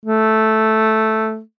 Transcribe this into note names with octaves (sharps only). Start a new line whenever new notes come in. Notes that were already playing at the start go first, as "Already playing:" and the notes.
A3